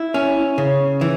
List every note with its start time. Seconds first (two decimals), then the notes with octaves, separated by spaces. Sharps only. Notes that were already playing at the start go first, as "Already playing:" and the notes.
Already playing: E4
0.14 C#4
0.58 C#3
1.01 E3